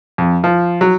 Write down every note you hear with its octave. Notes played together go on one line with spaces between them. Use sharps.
F2
F3
F#3